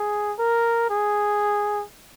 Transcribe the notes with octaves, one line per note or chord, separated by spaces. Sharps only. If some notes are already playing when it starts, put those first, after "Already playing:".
Already playing: G#4
A#4
G#4